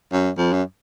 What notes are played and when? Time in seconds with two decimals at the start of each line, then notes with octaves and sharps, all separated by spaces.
0.12 F#2
0.38 F2
0.53 F#2